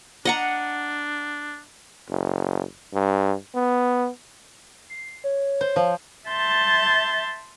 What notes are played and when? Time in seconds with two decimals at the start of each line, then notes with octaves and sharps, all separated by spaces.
0.25 D4 D#5 F#5 A#5
2.10 F#1
2.94 G2
3.55 B3
4.89 C7
5.24 C#5
5.61 C5
5.76 F3
6.29 E5 A5 C6 G6 A6